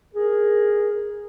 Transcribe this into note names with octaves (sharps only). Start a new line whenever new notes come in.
G#4 A#4